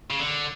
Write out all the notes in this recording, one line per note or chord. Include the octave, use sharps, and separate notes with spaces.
C#3
D3